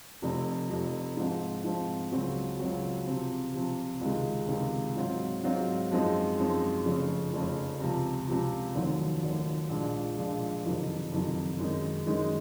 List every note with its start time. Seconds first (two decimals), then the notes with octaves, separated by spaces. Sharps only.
0.22 F1 F2 C3
0.70 F1 F2 C3
1.17 G#2 F3 C4
1.64 G#2 F3 C4
2.12 C#2 C#3 F#3 C4 F#4
2.59 C#2 C#3 F#3 C4 F#4
3.07 C3 F3 C4
3.54 C3 F3 C4
4.01 C#2 C3 D#3 G#3
4.48 C#2 C3 D#3 G#3
4.96 G#2 F#3 C4 F4
5.43 G#2 F#3 C4 F4
5.91 F#2 F3 G#3 C4 D#4
6.38 F#2 F3 G#3 C4 D#4
6.86 F1 F2 C#3
7.33 F1 F2 C#3
7.80 C#2 C3 F3
8.28 C#2 C3 F3
8.75 F1 D#2 D#3 F#3
9.22 F1 D#2 D#3 F#3
9.69 A#1 A#2 F3 G#3
10.16 A#1 A#2 F3 G#3
10.64 F#1 F2 C3 D#3
11.11 F#1 F2 C3 D#3
11.59 F#2 D#3 G#3 D#4
12.07 F#2 D#3 G#3 D#4